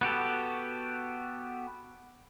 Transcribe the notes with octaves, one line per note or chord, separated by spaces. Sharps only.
B3 F#4 G4 A4